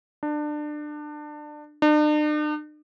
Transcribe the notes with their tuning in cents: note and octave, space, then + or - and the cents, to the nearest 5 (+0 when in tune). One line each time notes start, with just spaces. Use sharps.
D4 +25
D4 +45